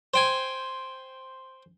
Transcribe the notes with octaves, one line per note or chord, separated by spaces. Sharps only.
C5 G5 G#5